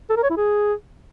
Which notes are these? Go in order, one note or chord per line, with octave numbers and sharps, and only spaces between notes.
A4
A#4
C#5
E4
G#4